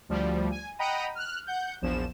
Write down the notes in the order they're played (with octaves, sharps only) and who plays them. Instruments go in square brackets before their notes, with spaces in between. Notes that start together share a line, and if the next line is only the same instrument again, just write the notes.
[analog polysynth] D2 F3 G3
G#5
D#5 F#5 G5 A#5 B5 D#7
F6 F#6
F#5 G6
A#1 E2 F3 E7